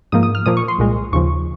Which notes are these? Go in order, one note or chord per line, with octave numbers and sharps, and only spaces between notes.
G#2 F3 A#3 D#6
D#6
F6
A#2 F3 A#3 D#6
C#6
C6
C2 A#2 G#3
D#2 C#3 F3 C#6